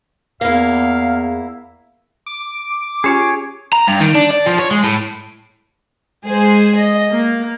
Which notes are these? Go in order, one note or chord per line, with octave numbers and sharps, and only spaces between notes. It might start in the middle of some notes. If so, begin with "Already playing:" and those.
E2 A#3 E4 F5
D6
C#4 F4 G4 G#4 C#5 G#5
A#5
G2
D#3
D4
D5
F3
C#5
G#3
A2
G#3 G#4 C5
D#5
A#3